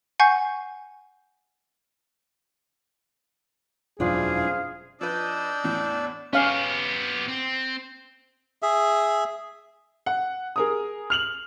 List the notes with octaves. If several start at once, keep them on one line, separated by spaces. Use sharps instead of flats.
F#5 G#5 C#6 G6 C7
E1 F#2 D4 E4 F4 G#4 C5 F5
F3 D4 B4 D5 D#5 E6 G6
E2 A2 E3
B3 C#4 G4 F5
C4
G#4 E5
F#5
G#4 A#4 D#6
F6 F7 F#7